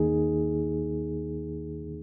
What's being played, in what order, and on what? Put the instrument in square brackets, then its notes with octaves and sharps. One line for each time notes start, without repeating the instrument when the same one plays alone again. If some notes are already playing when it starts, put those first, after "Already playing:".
Already playing: [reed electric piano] D#2 D#3 A#3 D#4 G#4